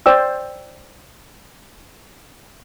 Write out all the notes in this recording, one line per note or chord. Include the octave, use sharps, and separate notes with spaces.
C5 D5 G5 E6